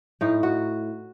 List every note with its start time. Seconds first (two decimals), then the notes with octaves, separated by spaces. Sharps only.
0.21 A2 D#4
0.43 F#4